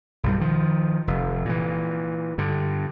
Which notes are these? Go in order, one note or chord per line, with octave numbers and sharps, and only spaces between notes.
B1 G2 G3
D#3 F3
F1
A#2 E3
G2 D3